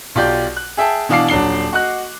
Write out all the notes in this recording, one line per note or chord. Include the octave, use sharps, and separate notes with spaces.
B1 F4 G4 D5 G6
F#6
G#4 E5 G5 A5
B2 E3 D4 F5 D6 C7
D#1 F#3 D4 C7 G7
F#4 D#5 F#6